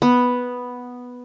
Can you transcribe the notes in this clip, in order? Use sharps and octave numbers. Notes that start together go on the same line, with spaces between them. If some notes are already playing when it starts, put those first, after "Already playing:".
B3